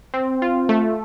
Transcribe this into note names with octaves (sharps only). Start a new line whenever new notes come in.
C4
F4
A3